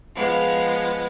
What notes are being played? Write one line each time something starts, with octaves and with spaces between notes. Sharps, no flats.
F3 G#3 B3 F5